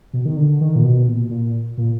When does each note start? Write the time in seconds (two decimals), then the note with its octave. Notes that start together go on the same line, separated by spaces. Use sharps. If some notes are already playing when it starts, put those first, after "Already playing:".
0.13 B2
0.26 D#3
0.37 D3
0.61 D#3
0.76 A#2
0.84 B2
1.07 A#2
1.30 A#2
1.78 A#2